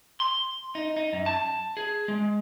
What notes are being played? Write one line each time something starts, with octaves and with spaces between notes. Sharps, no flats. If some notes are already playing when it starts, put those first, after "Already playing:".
C6
D#4
D#4
F#2
A5
G#4
G#3